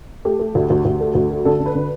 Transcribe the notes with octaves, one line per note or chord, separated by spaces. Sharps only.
A3 G4
A3
D2
D2
D2
A3
D2
A3
D3 A4
D3
B4
D3